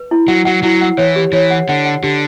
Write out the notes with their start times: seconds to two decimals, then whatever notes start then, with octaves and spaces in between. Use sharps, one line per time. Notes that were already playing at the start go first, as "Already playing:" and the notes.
Already playing: B4
0.11 E4
0.28 F#3 F#5
0.45 F#3 F#5
0.63 F#3 E4
0.81 F#5
0.98 E3 C#5
1.16 G4
1.33 E3 C#5
1.50 F#5
1.69 D3 F#5
1.85 F#5
2.03 D3 G4